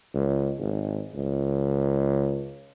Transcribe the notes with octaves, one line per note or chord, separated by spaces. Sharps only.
C#2
G#1
C#2